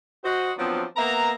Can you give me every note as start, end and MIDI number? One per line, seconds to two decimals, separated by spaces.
0.24 0.51 66
0.24 0.51 72
0.24 0.51 75
0.58 0.84 53
0.58 0.84 54
0.58 0.84 59
0.58 0.84 60
0.58 0.84 62
0.58 0.84 65
0.97 1.32 58
0.97 1.32 59
0.97 1.32 76
0.97 1.32 82